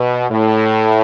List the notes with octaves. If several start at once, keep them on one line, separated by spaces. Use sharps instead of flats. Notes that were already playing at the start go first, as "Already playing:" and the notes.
Already playing: B2
A2